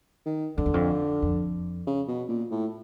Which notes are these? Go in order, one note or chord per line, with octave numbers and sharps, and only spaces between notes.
D#3
F2 D3
E2
F2
F2
C#3
B2
A#2
A2